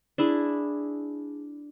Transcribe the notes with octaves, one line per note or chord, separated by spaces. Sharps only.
D4 E4 G#4